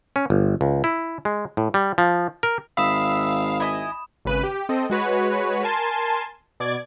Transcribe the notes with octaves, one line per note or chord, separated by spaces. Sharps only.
C#4
G1
C#2
E4
G#3
A2
G3
F3
A#4
G#1 E5 F5 B5 D#6 E7
E4 D#5 G#5
G#1 C#3 B4 F#6 D#7
G4
C4 A4 D#5
G#3 F#4 B4 C#5
A#4 G#5 A5 C6
B2 D5 D6 G#6